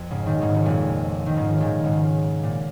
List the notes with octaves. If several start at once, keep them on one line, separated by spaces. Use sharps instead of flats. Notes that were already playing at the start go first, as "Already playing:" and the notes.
Already playing: F2
G#2 C#3
A#2 D#3
G#2 C#3
C#3
F2 A#2
D#3
G#2 C#3
A#2 D#3
G#2 C#3
A#2